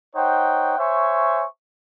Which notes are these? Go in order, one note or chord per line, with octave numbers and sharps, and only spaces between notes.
D#4 C5 C#5 F#5 G5
C5 C#5 E5 G#5 C#6